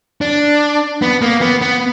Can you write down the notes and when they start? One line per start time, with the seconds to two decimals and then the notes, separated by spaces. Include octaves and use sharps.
0.21 D4
1.02 B3
1.21 A#3
1.41 B3
1.62 B3